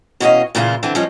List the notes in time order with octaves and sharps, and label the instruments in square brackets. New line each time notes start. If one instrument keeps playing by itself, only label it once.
[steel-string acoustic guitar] B2 E3 C#4 A4 D#5 F5
A#2 C#3 E3 D4 E4 F4
D3 E3 C4 D4
F3 G3 G#3 C#4 F4